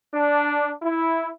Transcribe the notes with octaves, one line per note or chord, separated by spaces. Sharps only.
D4
E4